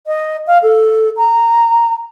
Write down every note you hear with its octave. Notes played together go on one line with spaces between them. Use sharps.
D#5
F5
A4
A#5